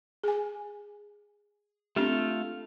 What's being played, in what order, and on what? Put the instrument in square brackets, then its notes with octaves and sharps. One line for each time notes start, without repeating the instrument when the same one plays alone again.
[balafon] G#4 G#5
[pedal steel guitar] A3 F4 F5 [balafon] C4 D4 G4